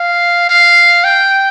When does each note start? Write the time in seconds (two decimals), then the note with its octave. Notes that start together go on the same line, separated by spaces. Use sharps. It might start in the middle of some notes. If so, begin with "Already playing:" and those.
Already playing: F5
0.50 F5
1.04 G5